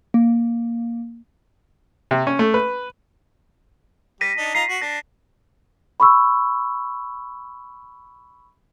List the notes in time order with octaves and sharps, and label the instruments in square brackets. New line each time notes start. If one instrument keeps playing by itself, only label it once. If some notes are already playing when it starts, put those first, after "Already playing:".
[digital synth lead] A#3
[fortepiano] C3
C#4
A3
B4
[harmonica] G3 [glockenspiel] A#6 B6 D#7
[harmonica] D4 D#4
[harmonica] D#4 F4 A#5 [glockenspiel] C7
[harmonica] F#4
[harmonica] D4 [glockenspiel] A#6
[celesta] B5 C#6 E6